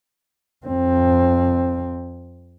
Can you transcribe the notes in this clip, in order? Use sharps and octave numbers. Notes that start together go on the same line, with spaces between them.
F2 C4